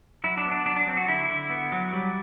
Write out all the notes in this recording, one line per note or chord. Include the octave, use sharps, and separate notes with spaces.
F#3 E4
D4
B3
D4
F#3 D4
D4
F#3 C4
F#4
D3 E4
D3
B3
F#3
G3